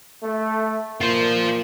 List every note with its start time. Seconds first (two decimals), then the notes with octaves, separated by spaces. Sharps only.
0.23 A3
1.01 A#2 F4 C5